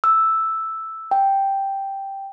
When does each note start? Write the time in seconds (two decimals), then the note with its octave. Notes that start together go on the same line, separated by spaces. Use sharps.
0.04 E6
1.11 G5